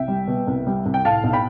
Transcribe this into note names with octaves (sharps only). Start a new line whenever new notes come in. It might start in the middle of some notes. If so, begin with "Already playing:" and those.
Already playing: C2 E5 G5
G3
B2
C2
G3
C2
G5
A2 F5 A5
B1
G5 B5